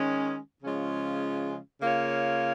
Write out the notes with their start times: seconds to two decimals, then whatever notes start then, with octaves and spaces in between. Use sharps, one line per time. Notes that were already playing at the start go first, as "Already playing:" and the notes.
Already playing: D#3 G#3 C#4
0.62 C#3 F3 G#3 C#4 F4
1.81 C#3 A#3 F4 C#5